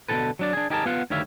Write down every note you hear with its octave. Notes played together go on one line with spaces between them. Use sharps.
B2 D3 E3 G#4 A4 B4
F#3 D4 D5
D4 G#4
D#4 G4 G#4 A#4 G#5 A5
B3 F4 F5 F#5
D2 D#3 G3 C#5 E5 F5